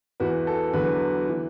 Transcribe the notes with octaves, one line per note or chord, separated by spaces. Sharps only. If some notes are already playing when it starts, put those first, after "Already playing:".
E2 E3 F#4 B4
A4
E2 D3 F#3 F#4 B4
E3